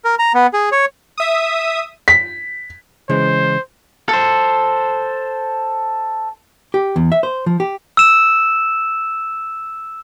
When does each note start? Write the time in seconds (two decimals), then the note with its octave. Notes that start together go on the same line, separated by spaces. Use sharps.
0.05 A#4
0.19 A#5
0.35 B3
0.53 G#4
0.72 C#5
1.18 E5 D#6
2.08 B6
3.09 C#3 E3 G#3 C5
4.09 A4 C5
6.74 G4
6.96 E2
7.12 E5
7.23 C5
7.46 F3
7.60 G4
7.97 E6 E7